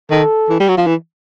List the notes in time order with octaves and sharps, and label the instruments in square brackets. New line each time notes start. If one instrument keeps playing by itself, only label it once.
[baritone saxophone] D#3 [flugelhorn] A4
[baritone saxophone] E3
G3
F#3
F3
E3